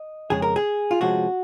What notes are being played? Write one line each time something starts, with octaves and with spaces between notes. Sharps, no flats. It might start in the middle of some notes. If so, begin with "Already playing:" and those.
Already playing: D#5
F2 C#3 G#3 G#4
A#4
G#4
F4
C3 F3 G#3 C#4 F#4